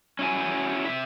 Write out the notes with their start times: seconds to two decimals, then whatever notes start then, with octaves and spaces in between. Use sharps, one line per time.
0.19 C#4 E4 F#4 G#5
0.85 C3 D#3 E5